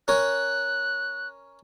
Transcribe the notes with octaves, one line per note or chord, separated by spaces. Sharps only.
C#4 A#4 C#5 F#6